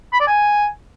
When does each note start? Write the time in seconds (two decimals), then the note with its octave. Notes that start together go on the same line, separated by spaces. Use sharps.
0.12 B5
0.20 D5
0.27 G#5